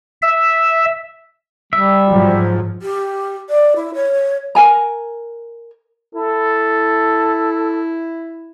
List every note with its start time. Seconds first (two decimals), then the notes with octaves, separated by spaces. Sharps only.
0.22 E5
1.73 G3 E5
2.09 G#2 F3 F#3
2.82 G4
3.50 D5
3.76 E4
3.95 C#5
4.55 A#4 G#5 A#5
6.15 E4 A4